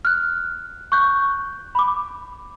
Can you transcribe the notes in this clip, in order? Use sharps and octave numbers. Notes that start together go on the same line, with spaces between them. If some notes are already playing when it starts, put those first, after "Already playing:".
F6 F#6
C#6 F#6 G6
B5 D6